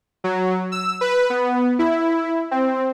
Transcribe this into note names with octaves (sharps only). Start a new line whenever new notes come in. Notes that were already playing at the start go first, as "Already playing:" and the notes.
F#3
E6
B4
B3
E4
C4